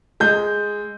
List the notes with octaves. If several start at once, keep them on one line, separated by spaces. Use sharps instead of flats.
G#3 G6